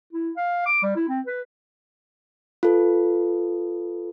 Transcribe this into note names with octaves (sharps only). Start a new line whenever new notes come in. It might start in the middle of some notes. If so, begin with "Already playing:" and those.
E4
F5
D6
G3
E4
C4
B4
F4 A4 B4